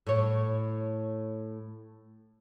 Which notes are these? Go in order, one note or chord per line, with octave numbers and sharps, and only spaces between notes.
A2 C#5